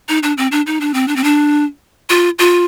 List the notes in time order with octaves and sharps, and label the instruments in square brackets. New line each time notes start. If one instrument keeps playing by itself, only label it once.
[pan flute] D#4
D4
C4
D4
D#4
D4
C4
D4
C4
D4
F4
F4